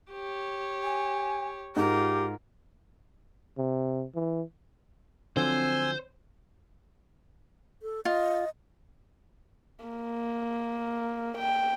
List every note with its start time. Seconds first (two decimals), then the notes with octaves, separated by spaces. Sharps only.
0.11 G4 C#5
0.83 G#5
1.76 G#2 F4 G4 A#4
3.57 C3
4.15 E3
5.37 D3 F3 F#3 C4 C5 G#5 E6
7.82 A4
8.05 F4 D#5
9.85 A#3
11.37 G5